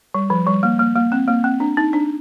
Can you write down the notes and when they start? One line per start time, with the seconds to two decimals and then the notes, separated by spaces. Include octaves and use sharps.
0.14 G3
0.30 F3
0.47 G3
0.63 A#3
0.79 A#3
0.96 A#3
1.12 C4
1.28 A#3
1.44 C4
1.60 D4
1.77 D#4
1.93 D4